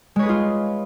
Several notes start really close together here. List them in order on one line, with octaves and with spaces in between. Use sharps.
G#3 C#5 B4 G#4 F4